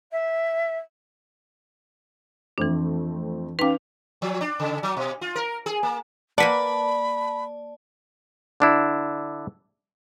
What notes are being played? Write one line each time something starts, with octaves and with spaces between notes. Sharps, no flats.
E5
F2 E3 A3 C4 D4
C#4 D#4 B4 F5 G5 D6 F7
F3
D4
C#3
F#3
B2
F4
A#4
G#4
A#3
A#3 B4 D5 F#5 A5 B5
D3 D4 E4